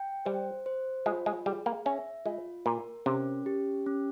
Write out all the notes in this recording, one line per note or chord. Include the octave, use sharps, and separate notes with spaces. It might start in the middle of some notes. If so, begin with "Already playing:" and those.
Already playing: G5
G3 C5
C5
G#3 F4
G#3
G3 G#4
A#3
C#4 E5
G#3 F4
A#2 A#4
C3 C#4
G4
C#4